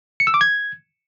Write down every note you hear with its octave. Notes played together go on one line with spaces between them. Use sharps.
C#7
E6
D6
G#6